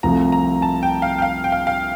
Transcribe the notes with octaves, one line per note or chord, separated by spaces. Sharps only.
C2 C3 F3 A3 A#5
A#5
A5
G5
F5
G5
F5
G5
F5
F5